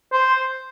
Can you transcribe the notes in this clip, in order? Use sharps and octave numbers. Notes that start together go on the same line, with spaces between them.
C5